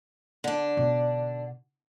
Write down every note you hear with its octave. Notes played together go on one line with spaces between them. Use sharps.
D3 D4
B2 D#4